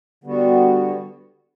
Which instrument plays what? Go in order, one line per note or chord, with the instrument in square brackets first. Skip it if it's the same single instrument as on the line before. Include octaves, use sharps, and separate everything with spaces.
[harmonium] D3 G3 B3 F#4